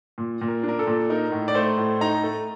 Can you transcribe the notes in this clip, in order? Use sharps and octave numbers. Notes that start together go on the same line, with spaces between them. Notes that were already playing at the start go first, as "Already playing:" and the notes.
A#2
A#2
A#4
D4
A#4
A4
A#2
D#4 A#4
A2
D5
A3 C5
A2
D#4 A#5
A3